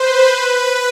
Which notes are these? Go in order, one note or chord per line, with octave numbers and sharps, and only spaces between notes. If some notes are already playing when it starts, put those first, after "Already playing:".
Already playing: B4 C5
B4